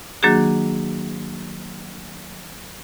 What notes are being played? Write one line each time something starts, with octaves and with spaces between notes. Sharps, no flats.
D#3 F#3 A#3 D4 F#4 G#4